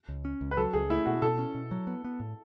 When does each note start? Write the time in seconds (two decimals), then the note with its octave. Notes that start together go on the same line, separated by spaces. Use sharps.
0.09 C#2
0.25 C#4
0.41 C#2
0.51 B4
0.57 F#3 A4
0.73 C#2 G#4
0.90 A3 E4
1.06 B2 F#4
1.22 B2 A4
1.39 C#4
1.55 B2
1.71 F#3
1.87 B3
2.05 B3
2.20 A2